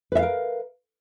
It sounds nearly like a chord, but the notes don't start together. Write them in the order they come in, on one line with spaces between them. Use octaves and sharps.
B4 E5 F5 A#4